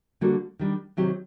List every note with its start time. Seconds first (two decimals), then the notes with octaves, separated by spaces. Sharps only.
0.21 D3 G3 A#3 F#4 A4
0.59 D#3 G3 D4
0.97 C3 D#3 F#3 C4 G4